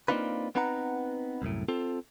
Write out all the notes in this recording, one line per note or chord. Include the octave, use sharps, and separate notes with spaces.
A#3 C4 D4 D#4 F4 B4
B3 C4 D#4 B4 F#5 A#5
C2 F#2 A2
C4 F4 A4